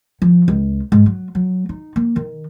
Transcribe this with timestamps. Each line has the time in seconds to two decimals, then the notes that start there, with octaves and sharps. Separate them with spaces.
0.22 F3
0.48 C#2
0.92 G#2
1.06 F#3
1.35 F#3
1.69 D#4
1.96 A#3
2.16 D#3